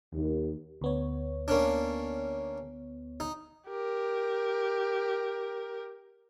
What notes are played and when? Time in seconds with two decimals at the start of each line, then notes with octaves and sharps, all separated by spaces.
0.14 D#2
0.81 D2 B3 C#5
1.48 A#3 C#4 D4
3.20 D#4
3.67 G4 A#4